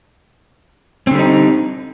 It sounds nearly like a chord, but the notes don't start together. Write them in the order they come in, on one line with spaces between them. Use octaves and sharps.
C4 D3 G3 D#4